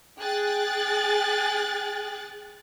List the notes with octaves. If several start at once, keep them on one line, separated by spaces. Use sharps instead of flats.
G#4 G5 F#6 A6